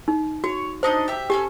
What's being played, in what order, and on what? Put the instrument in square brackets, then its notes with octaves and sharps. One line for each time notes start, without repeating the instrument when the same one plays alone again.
[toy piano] D#4
[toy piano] F#4 [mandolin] C#5
[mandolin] D4 D#4 D#5 [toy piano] C5
[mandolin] G4 E5
[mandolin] C#4 A4 G#5 [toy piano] G4